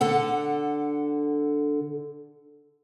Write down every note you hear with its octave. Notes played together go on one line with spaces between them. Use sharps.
D3 A4 F#5